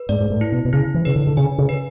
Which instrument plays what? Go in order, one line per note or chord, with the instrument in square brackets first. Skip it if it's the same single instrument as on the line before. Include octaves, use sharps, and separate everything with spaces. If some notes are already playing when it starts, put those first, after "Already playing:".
Already playing: [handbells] B4
[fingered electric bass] G#2 [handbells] D5
[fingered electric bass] G#2
A2
[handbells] E4
[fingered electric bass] B2
B2
[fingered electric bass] C#3 [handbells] E4
[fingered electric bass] E3
[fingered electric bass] C#3 [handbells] B4
[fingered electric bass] D3
D3
[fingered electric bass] C#3 [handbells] G#5
[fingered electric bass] C#3
[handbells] B4